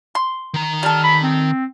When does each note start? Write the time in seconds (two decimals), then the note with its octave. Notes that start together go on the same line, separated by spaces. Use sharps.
0.15 C6
0.54 D#3 A#5
0.83 G3 A4 F6
1.04 B5
1.23 C4